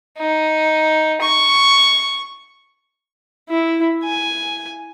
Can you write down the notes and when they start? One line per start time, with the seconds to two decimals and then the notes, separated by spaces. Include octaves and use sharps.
0.19 D#4
1.21 C#6
3.49 E4
4.04 G#5